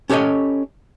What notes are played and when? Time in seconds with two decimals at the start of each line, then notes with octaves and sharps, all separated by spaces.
0.10 C#4 G4 A4 B4 C#5 D#5